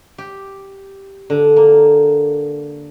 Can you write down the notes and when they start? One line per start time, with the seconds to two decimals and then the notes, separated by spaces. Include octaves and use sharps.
0.18 G4
1.30 D3
1.56 A#3